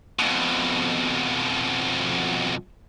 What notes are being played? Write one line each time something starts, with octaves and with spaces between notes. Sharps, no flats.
F2 B2